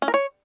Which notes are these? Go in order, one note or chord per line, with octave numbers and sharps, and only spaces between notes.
C#4
A#4
C#5